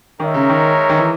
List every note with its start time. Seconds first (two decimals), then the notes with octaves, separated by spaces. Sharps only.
0.19 D#3 G#3 D#4 A#4 C#5 E5
0.34 C#3
0.49 D#3
0.89 D#3
0.98 E3